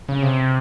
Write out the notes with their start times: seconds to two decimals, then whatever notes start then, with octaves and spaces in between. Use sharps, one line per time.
0.09 C#3
0.22 C3